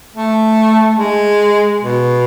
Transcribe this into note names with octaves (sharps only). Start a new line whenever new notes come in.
A3
G#3
B2